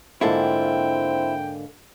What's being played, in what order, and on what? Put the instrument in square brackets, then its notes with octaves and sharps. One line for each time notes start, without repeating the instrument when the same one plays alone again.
[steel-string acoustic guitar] G#2 D3 A#3 [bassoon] C4 [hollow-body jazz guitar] E4 F4 A4 [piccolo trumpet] G5